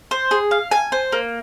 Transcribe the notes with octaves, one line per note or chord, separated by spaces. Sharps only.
C5
G#4
F5
G#5
C5
A#3